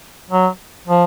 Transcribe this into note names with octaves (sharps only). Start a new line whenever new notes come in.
F#3
F3